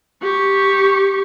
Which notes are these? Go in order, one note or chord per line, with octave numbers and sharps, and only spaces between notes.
G4 C#6